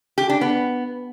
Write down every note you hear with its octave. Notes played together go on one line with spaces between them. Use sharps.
G4
D4
B3